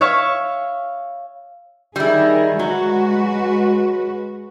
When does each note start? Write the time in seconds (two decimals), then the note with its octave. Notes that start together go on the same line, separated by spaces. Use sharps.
0.01 C#5 E5 F5 C#6
1.96 D#3 G3 E4 G#4
2.59 F#3 G#3 F#4 B4